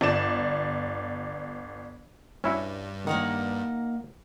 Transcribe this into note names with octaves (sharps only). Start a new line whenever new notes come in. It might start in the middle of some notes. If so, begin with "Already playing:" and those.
G1 D5 E7
G2 C#4 E4 F#4
D#3 A#3 D#4 F#5